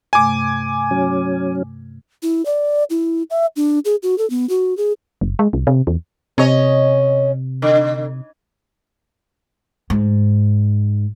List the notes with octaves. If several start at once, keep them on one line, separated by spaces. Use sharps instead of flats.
G2 C3 A3 G#5 D6
F#3 C#4
E4
D5
E4
E5
D4
G#4
F#4
A4
B3
F#4
G#4
F#1
G#3
C2
C3
E2
C3 C#4 C#5 D#5
D3
G#2